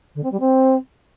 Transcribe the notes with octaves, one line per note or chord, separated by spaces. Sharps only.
D3
C4
G3
C4